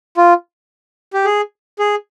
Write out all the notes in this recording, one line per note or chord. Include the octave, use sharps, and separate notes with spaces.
F4
G4
G#4
G#4